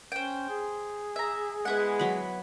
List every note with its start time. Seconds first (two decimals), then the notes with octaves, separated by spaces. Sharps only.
0.12 C#4 C5 G5
0.49 G#4
1.16 E5 A#5
1.65 G#3 B3 E4 F#5
1.99 F#3 B5